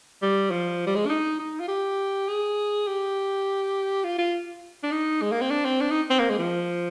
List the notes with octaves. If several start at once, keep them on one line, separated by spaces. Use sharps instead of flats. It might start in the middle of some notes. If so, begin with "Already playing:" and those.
G3
F3
G3
G#3
D4
D#4
D#4
F4
G4
G#4
G4
F4
F4
D4
D#4
G#3
A#3
C4
D4
C4
D4
D#4
C4
A#3
G#3
F3